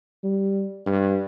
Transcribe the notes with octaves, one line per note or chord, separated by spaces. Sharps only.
G3
G2